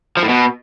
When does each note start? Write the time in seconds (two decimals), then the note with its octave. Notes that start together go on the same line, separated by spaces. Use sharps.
0.17 F3
0.23 A2
0.29 B2